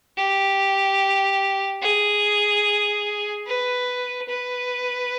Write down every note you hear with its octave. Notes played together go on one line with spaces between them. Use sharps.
G4
G#4
B4
B4